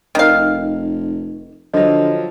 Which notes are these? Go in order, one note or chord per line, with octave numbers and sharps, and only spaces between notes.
F1 D#3 F5
D3 F3 F#3 D#5